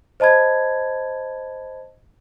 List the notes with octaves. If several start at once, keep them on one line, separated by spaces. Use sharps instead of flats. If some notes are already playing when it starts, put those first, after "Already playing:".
C5 D#5 A5 B5 G#6